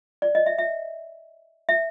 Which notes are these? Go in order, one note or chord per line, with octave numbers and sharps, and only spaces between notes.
D5
D#5
E5
E5
E5